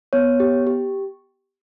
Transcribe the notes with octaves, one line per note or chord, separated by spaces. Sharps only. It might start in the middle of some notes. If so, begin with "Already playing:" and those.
B3 C#5
G4
G4